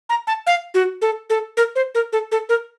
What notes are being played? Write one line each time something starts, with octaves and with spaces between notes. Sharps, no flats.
A#5
A5
F5
F#4
A4
A4
A#4
C5
A#4
A4
A4
A#4